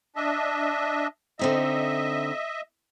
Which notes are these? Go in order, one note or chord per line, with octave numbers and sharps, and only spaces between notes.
D4 D#5 E5
D3 C4 D#4 D#5 E5